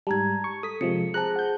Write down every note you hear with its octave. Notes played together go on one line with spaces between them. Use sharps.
G#2 G3 A5 A#5 G#6
C#6
A4 D#6 B6
C3 F3 G#3 C#7
G#4 C5 A5 A#5 F#6
F#5 G6